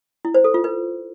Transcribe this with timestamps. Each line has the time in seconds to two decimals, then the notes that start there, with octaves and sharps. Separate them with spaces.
0.25 E4
0.35 C5
0.44 A4
0.54 F4
0.64 B4